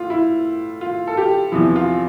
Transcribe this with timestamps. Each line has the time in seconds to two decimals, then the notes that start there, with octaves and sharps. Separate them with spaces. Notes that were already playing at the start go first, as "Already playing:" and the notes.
Already playing: A2 F4
0.10 E4
0.81 F4
1.07 A4
1.17 G4
1.52 E2 C3 F3 E4
1.76 F4